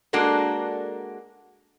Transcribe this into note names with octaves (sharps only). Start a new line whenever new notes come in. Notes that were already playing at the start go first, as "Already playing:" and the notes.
G#3 A#3 D4 F#4 A4 A#4